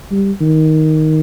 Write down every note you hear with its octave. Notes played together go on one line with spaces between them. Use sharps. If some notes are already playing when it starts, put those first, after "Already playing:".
G3
D#3